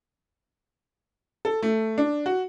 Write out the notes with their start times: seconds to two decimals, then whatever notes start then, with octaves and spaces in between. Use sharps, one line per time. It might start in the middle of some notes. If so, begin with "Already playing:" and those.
1.45 A4
1.63 A3
1.98 D4
2.26 F#4